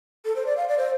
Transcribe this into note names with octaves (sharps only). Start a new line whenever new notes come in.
A4
C5
D5
F5
D5
C5